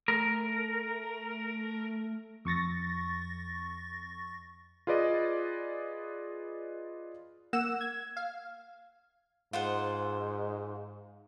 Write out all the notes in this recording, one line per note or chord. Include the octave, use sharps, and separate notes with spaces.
A3 A#4
F2 C#6 A6 A#6
F4 G#4 B4 D5 D#5
A#3 F#5 E6 E7
G#6
F5
G#2 F4 C5 F#5